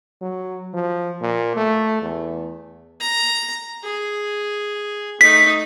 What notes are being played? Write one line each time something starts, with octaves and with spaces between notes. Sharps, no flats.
F#3
F3
A#2
A3
E2
A#5
G#4
A3 D#4 B6